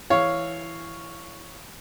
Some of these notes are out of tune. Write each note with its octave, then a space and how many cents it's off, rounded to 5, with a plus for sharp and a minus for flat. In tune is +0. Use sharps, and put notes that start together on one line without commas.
E3 +10 C#5 +0 F5 +0